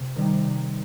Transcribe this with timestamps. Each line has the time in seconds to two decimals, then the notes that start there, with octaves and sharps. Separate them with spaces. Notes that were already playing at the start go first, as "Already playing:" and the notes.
Already playing: C3
0.16 D#3 G3 C4 D#4
0.44 C3